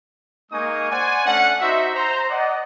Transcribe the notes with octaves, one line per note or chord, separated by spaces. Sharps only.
G#3 A#3 D#4 G#5 C#6 D#6
C5 D5 F#5 G#5
A3 C#4 D4 F#5
D#4 F#4 C5 E5
C5 A#5
D5 D#5 F#5